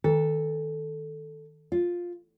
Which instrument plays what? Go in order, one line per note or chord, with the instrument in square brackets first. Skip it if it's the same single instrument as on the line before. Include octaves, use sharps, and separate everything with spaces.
[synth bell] D#3 [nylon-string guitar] A4
[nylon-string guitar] F4